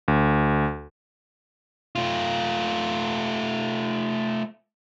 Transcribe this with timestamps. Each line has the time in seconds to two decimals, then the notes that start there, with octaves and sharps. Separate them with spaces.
0.08 D2
1.95 A3 F4